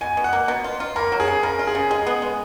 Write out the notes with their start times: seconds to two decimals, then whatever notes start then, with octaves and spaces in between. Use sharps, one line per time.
0.01 B2 G#5
0.17 B2
0.24 F#5
0.33 A#3
0.48 B2
0.64 F4
0.80 F4
0.96 A#3 A#4
1.12 F#3
1.20 G#4
1.28 C#3
1.43 C#3 A#4
1.59 F4
1.67 G#4
1.75 C#3
1.90 G#3 G#4
2.07 B3
2.22 G#3